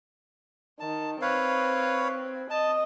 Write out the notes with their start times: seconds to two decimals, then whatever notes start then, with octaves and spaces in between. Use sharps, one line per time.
0.80 D#3 A5
1.21 C4 B4 C#5 F5
2.50 D#5 A5